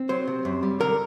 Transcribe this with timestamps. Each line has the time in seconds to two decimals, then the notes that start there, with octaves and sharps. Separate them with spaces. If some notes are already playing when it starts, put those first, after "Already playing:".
Already playing: C4
0.09 F#3 C5
0.28 C3
0.45 F#2
0.63 G3
0.80 D3 A#4